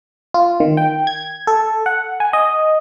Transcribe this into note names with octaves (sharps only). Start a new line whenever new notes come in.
F4
D#3
G5
G#6
A4
F#5
G#5
D#5